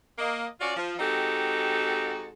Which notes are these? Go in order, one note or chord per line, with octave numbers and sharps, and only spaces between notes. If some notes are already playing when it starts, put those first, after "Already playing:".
A#3 D#5
C#4 F4 F#4 D5
F3
G#3 C4 D#4 F#4 G4 A4